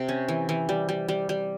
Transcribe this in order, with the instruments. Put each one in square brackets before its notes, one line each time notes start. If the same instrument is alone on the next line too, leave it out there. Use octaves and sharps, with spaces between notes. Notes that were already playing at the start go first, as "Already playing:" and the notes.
Already playing: [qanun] C3
C#4
E3
E3
G3
G3
G3
G3